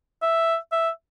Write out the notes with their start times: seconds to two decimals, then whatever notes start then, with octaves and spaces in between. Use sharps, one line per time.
0.22 E5
0.72 E5